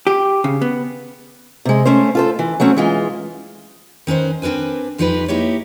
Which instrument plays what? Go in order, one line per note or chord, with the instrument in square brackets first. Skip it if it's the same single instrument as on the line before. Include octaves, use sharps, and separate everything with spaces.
[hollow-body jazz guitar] G4
C#3
B3
[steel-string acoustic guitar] C3 G#3
A3 C#4 C5
F4 A4 C5
E3
F#3 A3 C4 C#4
E3 G#3 F4
D#3 C#4 B4 C5
C4 D4 A#4 B4 G#5
F2 F3 G3 D#4 G4 B4
A#3 D#4 E4 G4 C#5